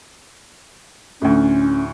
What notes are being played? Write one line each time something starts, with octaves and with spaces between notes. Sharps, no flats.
D2 A2 C#4